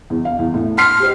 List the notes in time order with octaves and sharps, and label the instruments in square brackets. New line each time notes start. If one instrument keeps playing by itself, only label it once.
[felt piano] E2
F5
E2
A2
[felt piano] C6 B6 C7 [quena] F6
[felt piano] G4 C5 D#5